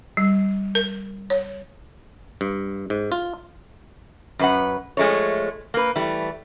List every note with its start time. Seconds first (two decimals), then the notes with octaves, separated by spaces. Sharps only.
0.17 G3
0.75 A#4
1.30 C#5
2.41 G2
2.90 G#2
3.12 F4
4.39 F#2 B4 F#5
4.97 F3 G#3 A3 D#4 C#5
5.74 A#3 B4
5.96 E3 G3 A3